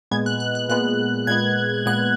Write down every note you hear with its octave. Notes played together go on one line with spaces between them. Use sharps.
A#2 G#3 B3 G#6
F#6
F#6
F#6
A#2 G#3 B3 F#6
A#2 G#3 B3 G#6
A#2 G#3 B3 F#6